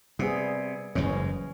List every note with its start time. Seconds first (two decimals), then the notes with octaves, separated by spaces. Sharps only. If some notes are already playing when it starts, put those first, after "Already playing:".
0.19 C3 G3 B3 G#4
0.95 F#1 D#2 G#2 E3 C#4